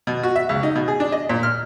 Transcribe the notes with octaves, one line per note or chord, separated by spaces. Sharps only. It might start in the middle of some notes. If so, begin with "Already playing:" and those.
B2
F#4
E5
C#2
D#4
B2
G#4
D4
D#5
A#2
F6